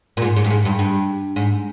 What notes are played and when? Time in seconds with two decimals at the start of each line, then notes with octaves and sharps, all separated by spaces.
0.17 A#2
0.22 G#2
0.36 G#2
0.45 G2
0.51 G#2
0.65 G2
0.79 G2
1.36 G#2